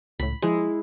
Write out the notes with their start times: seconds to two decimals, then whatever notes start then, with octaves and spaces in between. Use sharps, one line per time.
0.20 C#2 A2 B5
0.42 F3 G#3 E4